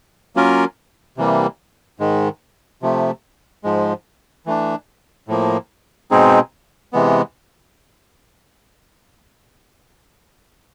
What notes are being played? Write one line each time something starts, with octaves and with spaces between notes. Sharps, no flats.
F#3 A#3 C#4 F4 A#4
C3 E3 G3 A#3
G#2 D#3 G#3
C3 F3 A3
G#2 F3 G#3
E3 A3 D4
A2 F3 A#3
B2 G#3 C4 D#4 G#4
C3 E3 G#3 B3